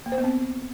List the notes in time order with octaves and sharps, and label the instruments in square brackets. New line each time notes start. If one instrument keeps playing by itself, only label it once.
[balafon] A#3
C5
B3
C4